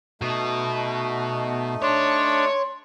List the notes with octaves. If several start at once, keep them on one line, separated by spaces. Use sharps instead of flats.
B2 A3 D#4
D4 C#5 C6